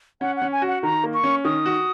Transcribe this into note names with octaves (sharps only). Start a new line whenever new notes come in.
C#4 F#5
F#5
C#4
G#5
F#4
F#5
D#3 A#5
A#3
C#6
C#4
D#3 D#6
F#4